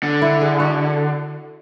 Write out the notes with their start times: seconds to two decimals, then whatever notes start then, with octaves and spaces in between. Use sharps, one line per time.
0.03 D3
0.22 E4
0.41 G#4
0.60 F#4